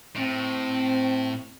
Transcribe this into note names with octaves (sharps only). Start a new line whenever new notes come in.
A2 C4